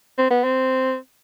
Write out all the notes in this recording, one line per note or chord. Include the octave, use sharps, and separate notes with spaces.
C4
B3
C4